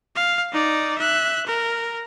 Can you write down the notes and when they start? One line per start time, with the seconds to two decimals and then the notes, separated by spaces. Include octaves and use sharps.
0.16 F5
0.52 D#4 D5
0.98 E5 F#6
1.47 A#4